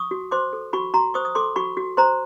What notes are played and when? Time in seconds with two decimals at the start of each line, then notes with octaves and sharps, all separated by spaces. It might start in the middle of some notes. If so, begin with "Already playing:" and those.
Already playing: C#6 D#6
0.11 F#4
0.31 C5 C6 D6
0.53 A4
0.73 F#4 B5 C#6
0.94 F#4 A#5 C6
1.14 C5 C#6 D#6
1.25 D#6
1.35 A4 C6 D6
1.56 F#4 B5 C#6
1.77 F#4
1.97 C5 A#5 C6